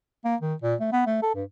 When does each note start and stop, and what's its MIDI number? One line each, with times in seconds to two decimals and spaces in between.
0.25 0.36 58
0.41 0.54 51
0.62 0.75 46
0.80 0.89 57
0.92 1.03 59
1.06 1.18 57
1.22 1.33 69
1.34 1.44 43